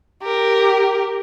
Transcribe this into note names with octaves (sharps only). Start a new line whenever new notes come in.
G4 A#4